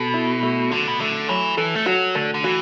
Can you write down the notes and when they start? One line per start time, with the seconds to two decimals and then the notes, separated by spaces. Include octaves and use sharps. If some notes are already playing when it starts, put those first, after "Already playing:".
Already playing: B2 A4
0.14 E4
0.43 A3
0.70 D3 F#4
0.88 B2
1.00 D3 A3
1.29 E3 F#3
1.57 E3 A4
1.75 A3
1.86 F#3 F#4
2.15 D3 A3
2.34 D3
2.44 E3 F#4